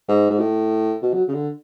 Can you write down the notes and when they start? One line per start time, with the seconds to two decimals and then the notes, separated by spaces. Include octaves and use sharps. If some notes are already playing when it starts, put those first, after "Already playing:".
0.08 G#2
0.30 G#2
0.39 A2
1.02 B2
1.14 F#3
1.28 C#3
1.34 D3